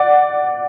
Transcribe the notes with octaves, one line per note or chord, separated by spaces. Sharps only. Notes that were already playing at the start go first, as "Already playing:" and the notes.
Already playing: D5 F#5